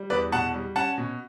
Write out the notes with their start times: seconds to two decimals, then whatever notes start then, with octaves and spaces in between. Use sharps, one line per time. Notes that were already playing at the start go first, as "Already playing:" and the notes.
Already playing: G3
0.10 E2 B4 D5
0.32 B2 F#5 A5
0.54 G3
0.76 C#4 F#5 A5
0.98 B2